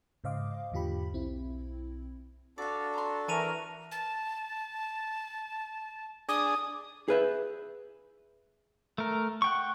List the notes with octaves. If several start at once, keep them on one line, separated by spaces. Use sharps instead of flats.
G#2 C#3 C5 D#5 F5 D6
E2 G#2 D3 F4 G4 B5
B1 C4 E4
D4 F#4 A4 D5 F5
A#5 C6
E3 A#4 A5 C#6 D#7 F7
A5
D4 G#4 D#6
G#4 B4 E5
A3 A#4
F#5 G5 C#6